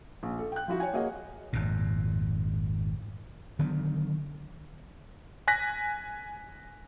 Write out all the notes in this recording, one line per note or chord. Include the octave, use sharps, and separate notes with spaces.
A#1
A4
G5 F#6
F3 E4 F#4
C#5 G5 G#5
A#3 F#4 G#4 C#5 D#5 F#5
G#1 F2 A#2
D3 D#3 F#3 B3
G#5 F#6 A#6 B6